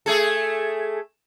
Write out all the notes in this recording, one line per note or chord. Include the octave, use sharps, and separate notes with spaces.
A3 G#4 A4